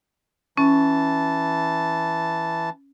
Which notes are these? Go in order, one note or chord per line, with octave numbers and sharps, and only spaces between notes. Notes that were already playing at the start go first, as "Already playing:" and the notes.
E3 C#4 A5